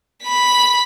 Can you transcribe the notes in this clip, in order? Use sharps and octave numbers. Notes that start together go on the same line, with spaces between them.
B5 B6